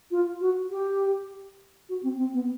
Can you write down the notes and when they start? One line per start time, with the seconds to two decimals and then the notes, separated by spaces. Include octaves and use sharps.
0.11 F4
0.41 F#4
0.71 G4
1.89 F#4
2.03 C4
2.18 C4
2.33 B3